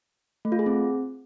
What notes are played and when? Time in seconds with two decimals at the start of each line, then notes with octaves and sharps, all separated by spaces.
0.45 A3
0.52 F4
0.59 G#4
0.66 C4